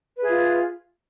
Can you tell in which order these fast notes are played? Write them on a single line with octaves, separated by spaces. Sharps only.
B4 G#4 E5 F4